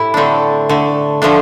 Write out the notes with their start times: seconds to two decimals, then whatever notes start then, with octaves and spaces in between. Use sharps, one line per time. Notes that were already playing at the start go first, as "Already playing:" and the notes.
Already playing: A2 E4 G4
0.14 D3 A3 C4 D4
0.69 D3 A3
1.22 D3 F3 A3 D4